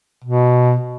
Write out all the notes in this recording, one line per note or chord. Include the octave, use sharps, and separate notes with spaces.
B2